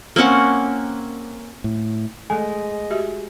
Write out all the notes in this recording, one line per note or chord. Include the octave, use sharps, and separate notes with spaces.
A#3 C4 C#4 F#5
A2
G#3 A3 A4 D#5 G#5
F#4 G4 E5